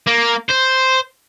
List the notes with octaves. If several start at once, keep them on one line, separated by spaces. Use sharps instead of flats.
A#3
C5